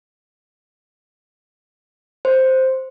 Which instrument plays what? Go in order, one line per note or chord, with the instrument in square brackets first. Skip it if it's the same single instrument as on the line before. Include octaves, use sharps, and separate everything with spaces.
[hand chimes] C5